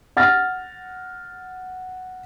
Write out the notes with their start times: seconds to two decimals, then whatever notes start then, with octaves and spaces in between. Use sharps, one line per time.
0.17 F#5 F6 A6 A#6